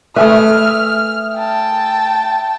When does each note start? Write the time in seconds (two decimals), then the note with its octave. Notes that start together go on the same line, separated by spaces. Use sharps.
0.16 A3 B4 E5 G#5 D#6 F6
1.35 G5 A5